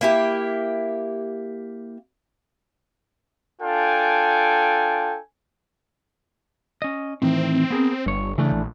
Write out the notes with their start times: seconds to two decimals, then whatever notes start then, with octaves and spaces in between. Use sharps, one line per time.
0.01 A#3 E4 G4
3.62 D4 F4 A4 G5 G#5
6.82 C#4 D#5
7.22 A2 D#3 E3 C4
7.70 B3 G#4 A#4
8.06 G1 G2 C#5
8.38 C#3 E3 A3 D4
8.52 A#1